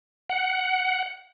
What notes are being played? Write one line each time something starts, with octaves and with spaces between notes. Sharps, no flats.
F#5